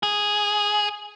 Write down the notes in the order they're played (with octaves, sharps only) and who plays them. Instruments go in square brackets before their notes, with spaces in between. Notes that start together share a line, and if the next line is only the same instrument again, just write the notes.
[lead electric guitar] G#4